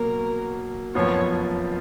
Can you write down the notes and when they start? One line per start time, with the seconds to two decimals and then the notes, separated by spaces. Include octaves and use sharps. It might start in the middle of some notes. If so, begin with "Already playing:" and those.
Already playing: B2 F#3 A#3 A#4
0.94 F#1 F2 F3 B3 F4 C#5